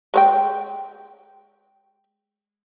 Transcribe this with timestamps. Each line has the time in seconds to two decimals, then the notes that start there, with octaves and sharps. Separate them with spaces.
0.14 G#3 C#5 G5